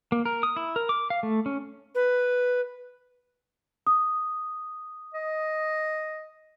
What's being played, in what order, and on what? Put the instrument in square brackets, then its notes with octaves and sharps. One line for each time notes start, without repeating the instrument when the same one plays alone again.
[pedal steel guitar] A#3
A#4
D#6
E4
A#4
D6
F5
A3
C#4
[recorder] B4
[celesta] D#6
[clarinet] D#5